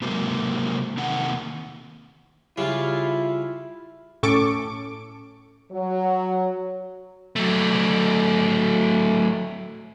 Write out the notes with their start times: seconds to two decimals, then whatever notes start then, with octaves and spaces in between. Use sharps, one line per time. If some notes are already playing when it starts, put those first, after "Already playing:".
0.02 C3 F#3 G#3 A#3 C4
0.97 C3 D#3 A#3 F#5
2.58 C#3 G3 E4 F4 F5
4.23 A2 C#4 A4 C#6 D6 D7
5.71 F#3
7.36 F#3 A3